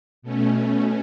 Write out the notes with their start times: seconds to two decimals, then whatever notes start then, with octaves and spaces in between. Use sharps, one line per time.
0.22 B2 A3 C#4